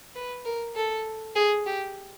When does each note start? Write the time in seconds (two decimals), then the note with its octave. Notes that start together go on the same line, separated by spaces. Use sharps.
0.15 B4
0.45 A#4
0.76 A4
1.36 G#4
1.66 G4